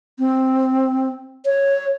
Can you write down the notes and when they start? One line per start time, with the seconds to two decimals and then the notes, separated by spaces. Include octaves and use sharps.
0.19 C4
1.46 C#5